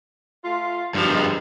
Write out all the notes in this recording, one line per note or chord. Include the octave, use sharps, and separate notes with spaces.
A3 F4
G2 F3 F#3 B3
G#2 C3 G#3